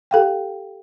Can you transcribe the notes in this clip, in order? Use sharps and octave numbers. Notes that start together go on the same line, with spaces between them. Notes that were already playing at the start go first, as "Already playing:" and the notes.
G4 A4 F5 G5